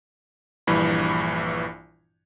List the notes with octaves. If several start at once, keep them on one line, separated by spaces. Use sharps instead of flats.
A#1 G2 E3 B5